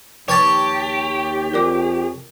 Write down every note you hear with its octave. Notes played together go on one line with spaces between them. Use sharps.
D#2 F3 G4 B4 C#5 G5 A5
F2 A#4 D5 D6